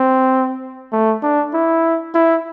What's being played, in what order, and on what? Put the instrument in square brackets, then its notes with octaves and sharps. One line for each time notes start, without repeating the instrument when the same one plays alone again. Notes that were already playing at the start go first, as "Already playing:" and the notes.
Already playing: [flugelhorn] C4
A3
D4
E4
E4